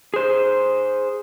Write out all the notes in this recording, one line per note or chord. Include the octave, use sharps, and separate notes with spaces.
G#4 C5